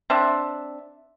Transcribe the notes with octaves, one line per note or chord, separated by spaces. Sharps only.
C4 D4 E5